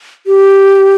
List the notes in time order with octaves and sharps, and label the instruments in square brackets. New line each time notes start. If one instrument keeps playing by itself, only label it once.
[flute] G4